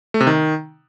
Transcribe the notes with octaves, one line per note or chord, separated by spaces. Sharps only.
A3
C3
D#3